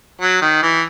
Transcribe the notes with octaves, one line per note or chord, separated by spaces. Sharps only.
F#3
D#3
E3